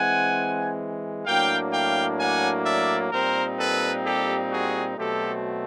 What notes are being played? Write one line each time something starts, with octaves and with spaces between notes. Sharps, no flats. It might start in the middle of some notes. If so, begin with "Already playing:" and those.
Already playing: E3 G#3 C4 F#5 G#5
A2 F#3 A#3 D4 F5 G5
F5 G5
F#5 G#5
D5 E5
A#2 G3 C4 D#4 A#4 C5
A4 B4
G4 A4
F#4 G#4
B2 F#3 A3 C4 G4 A4